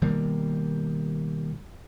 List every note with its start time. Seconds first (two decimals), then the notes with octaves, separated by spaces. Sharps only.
0.02 B2 D#3 G3 A#3